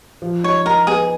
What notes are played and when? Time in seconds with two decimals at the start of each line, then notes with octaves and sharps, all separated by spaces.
0.22 F3
0.44 D#4 C#5
0.65 D#4 A#4
0.87 B3 G#4